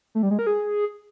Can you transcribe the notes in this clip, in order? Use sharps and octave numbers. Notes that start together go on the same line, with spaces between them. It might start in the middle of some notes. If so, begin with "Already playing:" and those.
A3
G3
G#3
A#4
G#4